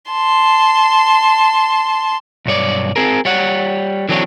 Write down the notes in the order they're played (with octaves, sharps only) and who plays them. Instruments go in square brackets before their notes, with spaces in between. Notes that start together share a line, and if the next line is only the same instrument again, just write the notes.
[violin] A5 C6
[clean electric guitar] B1 G2 C#5 D5
C4 G#4 A#4
G3 C#5 F#5
D3 E3 F#3 C4 D4 C#5